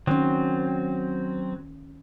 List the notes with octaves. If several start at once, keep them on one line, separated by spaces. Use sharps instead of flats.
D#3 F#3 C4 C#4